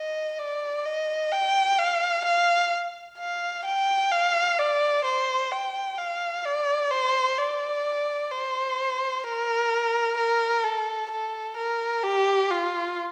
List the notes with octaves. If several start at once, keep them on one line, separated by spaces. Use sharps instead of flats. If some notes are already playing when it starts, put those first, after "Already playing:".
Already playing: D#5
D5
D#5
G5
F5
F5
F5
G5
F5
D5
C5
G5
F5
D5
C5
D5
C5
A#4
A#4
A4
A4
A#4
G4
F4